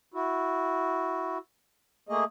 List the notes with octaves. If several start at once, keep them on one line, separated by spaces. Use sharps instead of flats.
E4 F#4
A3 A#3 G#4 D#5